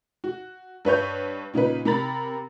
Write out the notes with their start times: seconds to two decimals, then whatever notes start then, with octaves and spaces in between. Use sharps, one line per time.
0.24 F#4
0.85 G2 B4 C#5 G6
1.54 A#2 C#3 D#4 B4
1.85 C3 A#4 A#5 B5 A6